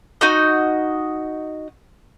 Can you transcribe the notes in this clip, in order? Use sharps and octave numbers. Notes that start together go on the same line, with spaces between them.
D#4 F#4 D#5